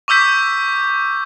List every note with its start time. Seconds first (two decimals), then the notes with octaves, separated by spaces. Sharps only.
0.08 C#6 D6 E6 G6 B6